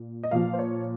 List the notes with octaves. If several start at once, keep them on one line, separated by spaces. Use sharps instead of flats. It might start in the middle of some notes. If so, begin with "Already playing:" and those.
Already playing: A#2
D#5
A#2 F3 F5
C5
C#5